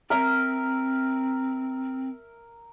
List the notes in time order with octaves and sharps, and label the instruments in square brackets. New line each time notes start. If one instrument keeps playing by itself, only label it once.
[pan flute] C4 [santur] A#4 E5